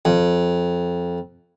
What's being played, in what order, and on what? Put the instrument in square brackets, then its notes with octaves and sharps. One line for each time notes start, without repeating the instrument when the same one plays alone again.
[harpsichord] F2